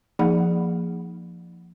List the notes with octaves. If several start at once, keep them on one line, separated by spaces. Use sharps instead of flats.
F3 A#3 D#4 G#4 F#5 B5